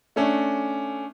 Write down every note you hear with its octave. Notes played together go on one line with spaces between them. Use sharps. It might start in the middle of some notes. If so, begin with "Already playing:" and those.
A3 C#4 D4